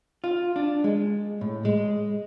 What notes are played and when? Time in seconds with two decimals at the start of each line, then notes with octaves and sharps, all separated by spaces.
0.24 F4
0.56 D4
0.84 G#3
1.41 A2
1.65 G#3